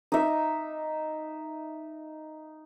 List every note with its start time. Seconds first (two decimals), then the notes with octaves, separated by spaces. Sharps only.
0.12 D#4 E5